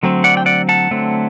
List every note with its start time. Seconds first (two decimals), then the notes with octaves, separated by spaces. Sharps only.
0.03 D3 F#3 A3 C4
0.24 D5 F#5
0.37 G5
0.46 D5 F#5
0.69 F#5 A5
0.91 D3 F#3 A3 C4